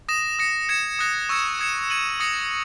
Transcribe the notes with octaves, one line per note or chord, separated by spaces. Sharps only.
D#6 A#6 E7
D#6 A#6 C#7
G#6 C#7 E7
D#6 F#6 A#6 E7
C#6 E6 G#6 C#7 E7
D#6 G#6 C#7 E7
G#6 D#7 F#7
D#6 A#6 C#7 F#7